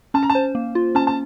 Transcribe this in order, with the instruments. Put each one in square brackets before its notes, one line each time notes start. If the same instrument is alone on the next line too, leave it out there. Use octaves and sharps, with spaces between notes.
[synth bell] C#4 [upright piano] A5
[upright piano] A#5
A5
[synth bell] C5
A#3
F4
[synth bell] C#4 [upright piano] A5
[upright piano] A5